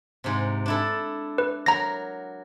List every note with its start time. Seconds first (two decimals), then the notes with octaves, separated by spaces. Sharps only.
0.24 G#2 C3
0.66 D4 E4 A4
1.38 B4
1.66 F#3 A#4 A#5 A#6